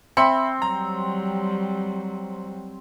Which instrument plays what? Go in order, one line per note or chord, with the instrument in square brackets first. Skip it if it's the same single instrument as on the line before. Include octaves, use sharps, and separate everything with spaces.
[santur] C4 [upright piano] E5 B5 C#7
[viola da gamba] F#3 G3 [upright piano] A#5